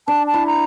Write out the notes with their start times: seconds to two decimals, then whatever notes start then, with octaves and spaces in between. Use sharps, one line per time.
0.08 D4 A5
0.27 A5
0.34 E4
0.47 A#5